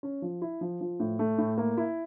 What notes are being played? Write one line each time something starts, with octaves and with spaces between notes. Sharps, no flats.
C#4
F3
E4
F3
F3
A2
A3
A2
A#3
E4